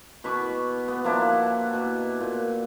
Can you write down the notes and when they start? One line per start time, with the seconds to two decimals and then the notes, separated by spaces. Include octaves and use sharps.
0.24 B2 B5 C#6 D6
0.88 B3
1.04 F3 A#3 D4 E4
1.29 G4 F#5
1.73 B2
2.21 A#2